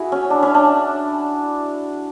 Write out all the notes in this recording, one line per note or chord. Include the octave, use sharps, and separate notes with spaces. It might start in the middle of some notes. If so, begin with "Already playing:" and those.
Already playing: E4 F#4 G#4
C#4
D4
C#4
D4